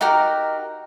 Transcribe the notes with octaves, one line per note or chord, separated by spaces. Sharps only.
D#4 F#4 G4 A#4